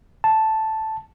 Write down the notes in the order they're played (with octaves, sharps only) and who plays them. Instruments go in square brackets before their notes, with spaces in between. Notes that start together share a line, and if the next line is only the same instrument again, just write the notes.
[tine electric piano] A5